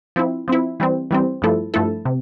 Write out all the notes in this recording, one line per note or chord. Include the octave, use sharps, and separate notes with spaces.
F3 C4 E4
F3 C4 E4
E3 G3 C4
E3 G3 C4
G2 F3 A3 E4 A4
G2 F3 A3 E4 A4
C3